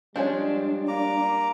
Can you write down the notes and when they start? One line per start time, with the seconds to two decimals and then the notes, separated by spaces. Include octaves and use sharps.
0.16 F3 G3 G#3 C#4 D4
0.88 A#3 A#5 D6